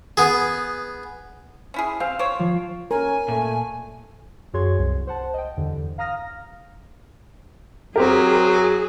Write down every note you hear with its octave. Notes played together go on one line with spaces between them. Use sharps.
B3 G#4
C#4 E4 G#4
C4 F5 E7
C5 C#5 D6
F3
C#4 A#4 G#5
A#2 A3
F#2 F#4 G#4 C#5 C6 G#6
C2
C5 F#5 A5
D#5 G5
E2 G2 D3
F5 A#5 D#6 F6 A#6
F#3 C4 G4 G#4 A#4